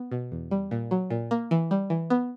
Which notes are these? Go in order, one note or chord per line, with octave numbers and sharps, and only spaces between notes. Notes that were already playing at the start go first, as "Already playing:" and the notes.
Already playing: B3
B2
E2
G3
A#2
F#3
A#2
A#3
E3
G3
E3
B3